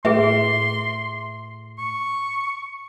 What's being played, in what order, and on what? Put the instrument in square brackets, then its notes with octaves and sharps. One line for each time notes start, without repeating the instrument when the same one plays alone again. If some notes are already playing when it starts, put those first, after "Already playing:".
[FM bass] A2 [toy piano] G#4 B4 E5 [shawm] C6
[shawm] C#6